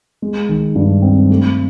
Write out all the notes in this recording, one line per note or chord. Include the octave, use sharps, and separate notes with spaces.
G#3
D#3
G2
C4
A3